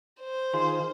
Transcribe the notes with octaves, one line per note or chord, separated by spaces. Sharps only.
C5
D#3 F4 G#4 C6